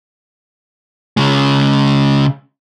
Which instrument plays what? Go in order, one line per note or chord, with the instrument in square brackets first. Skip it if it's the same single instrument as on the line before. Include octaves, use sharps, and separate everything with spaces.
[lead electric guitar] C#3 G#3